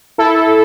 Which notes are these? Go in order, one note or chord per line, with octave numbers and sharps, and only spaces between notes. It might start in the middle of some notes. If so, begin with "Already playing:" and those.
E4 A4